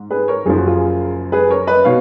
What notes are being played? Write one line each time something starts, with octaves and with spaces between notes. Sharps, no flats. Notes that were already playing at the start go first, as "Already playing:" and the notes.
Already playing: G#2
G#4 B4
A#4 C#5
F#1 F#2 F3 G#4
F#4
F4 G#4
G#4 B4
A#4 C#5
B4 D#5
B2 C#5 F5